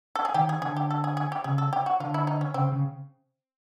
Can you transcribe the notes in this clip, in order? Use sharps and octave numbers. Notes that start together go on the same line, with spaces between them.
A4
G#4
D#3 G4
G#4
D3 G#4
G4
A4
G#4
G#4
G4
C#3 G#4
A4
G4
F#4
D3 F4
E4
D#4
C#4
C#3 C4
C#3